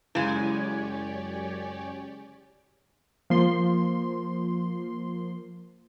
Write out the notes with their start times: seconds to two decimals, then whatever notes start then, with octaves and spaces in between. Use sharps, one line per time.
0.15 F#2 C#3 G#3 E4 G4 C#5 D5 G#5
3.30 F3 A#3 C6